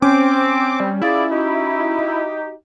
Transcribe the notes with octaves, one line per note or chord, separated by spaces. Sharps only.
C4 C#4 D6
G3
E4 F4 G#4 D5
D#4 F#4 G4